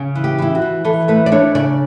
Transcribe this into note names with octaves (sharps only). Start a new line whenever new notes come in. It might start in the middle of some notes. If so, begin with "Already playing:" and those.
Already playing: C#3
E3
G4
E3 E4
F#4
E3
E3 A4
A3 B4
D5
D4 C#5
C#3 D5